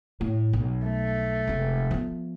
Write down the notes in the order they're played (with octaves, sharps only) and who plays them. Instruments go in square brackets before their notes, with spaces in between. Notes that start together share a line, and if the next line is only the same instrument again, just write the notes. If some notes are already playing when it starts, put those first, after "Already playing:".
[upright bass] A2
B1
[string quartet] A3
[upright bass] F1 G#3
F3 B3